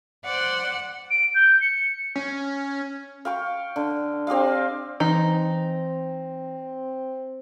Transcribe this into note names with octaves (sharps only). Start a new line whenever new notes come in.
C5 D5 F#5
D7
G6
C#7
C#4
F5 G5 C#6
D3
C4 G4 D#5 F5
E3 C4 D#4 A#5